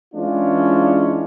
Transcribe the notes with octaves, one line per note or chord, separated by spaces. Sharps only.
E3 G#3 C#4 D4 F4